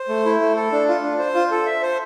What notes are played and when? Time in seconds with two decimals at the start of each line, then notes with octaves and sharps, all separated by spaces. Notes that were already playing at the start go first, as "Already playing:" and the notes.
Already playing: C5
0.08 A3
0.25 E4
0.41 A3
0.56 A4
0.72 D4
0.88 F4
1.03 D4
1.19 C5
1.34 F4
1.51 A4
1.66 E5
1.82 C5